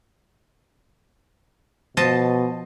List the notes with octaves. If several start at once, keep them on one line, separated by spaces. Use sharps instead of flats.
B2 F3 D#5 A5